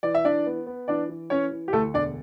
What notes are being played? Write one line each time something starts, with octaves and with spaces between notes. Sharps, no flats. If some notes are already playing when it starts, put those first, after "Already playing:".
E3 D5
E5
E3 D4 D5
B3
B3
E3 D4 D5
E3
E3 C#4 C#5
E3
G4
D2 A3 A4
E1 D4 D5